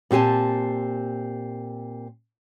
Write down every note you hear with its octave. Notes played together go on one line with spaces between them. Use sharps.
A#2 C4 G4 G#5 A5